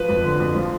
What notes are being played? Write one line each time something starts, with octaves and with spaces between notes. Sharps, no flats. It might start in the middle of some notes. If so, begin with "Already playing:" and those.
Already playing: F3 B4
F2
D3
F2
F3